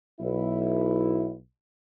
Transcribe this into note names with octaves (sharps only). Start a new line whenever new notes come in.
B1 E4